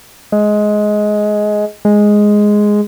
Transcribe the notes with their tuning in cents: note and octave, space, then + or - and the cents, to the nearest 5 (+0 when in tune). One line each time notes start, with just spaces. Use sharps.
G#3 +15
G#3 +0